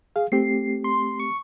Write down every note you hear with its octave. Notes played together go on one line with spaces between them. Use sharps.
G#4 F5
A3 C4 G4 C7
C6
C#6